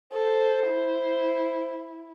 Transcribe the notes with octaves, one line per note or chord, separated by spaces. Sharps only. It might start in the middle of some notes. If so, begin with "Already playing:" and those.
A4 C5
E4